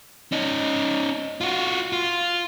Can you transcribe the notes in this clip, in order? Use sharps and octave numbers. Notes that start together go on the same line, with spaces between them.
C#4 D#4
F4 F#4
F4